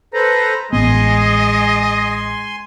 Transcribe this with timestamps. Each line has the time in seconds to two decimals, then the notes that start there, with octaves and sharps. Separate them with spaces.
0.14 A4 B4 C5 A#5
0.73 A1 G#3 B3 D#5 G#5 C6